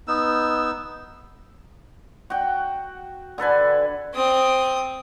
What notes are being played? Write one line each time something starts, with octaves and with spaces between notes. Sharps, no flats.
B3 D#4 E6
F#4 G5
D3 A4 B4 G#5
C4 D#6